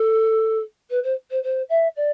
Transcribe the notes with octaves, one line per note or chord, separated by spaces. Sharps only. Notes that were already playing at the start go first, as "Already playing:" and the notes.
Already playing: A4
B4
C5
C5
C5
E5
D5